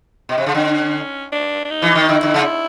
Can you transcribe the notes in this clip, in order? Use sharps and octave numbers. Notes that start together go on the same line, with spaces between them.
B2
C3
C#3
D3 C#4
D4
D4
D#4
E3
D#3
D3 E4
D3
C#3